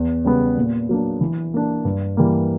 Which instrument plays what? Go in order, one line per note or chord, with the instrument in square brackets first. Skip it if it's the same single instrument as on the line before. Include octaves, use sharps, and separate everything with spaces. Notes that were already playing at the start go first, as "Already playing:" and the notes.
Already playing: [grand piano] E2
C#3 G3 B3
A#2
F#3 A#3 D4
E3
A#3 D4
G2
E3 G3 A#3